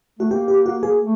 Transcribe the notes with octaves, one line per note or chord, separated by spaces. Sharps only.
A3 F#4
A#3 G4
G4
F#4
G#4
A3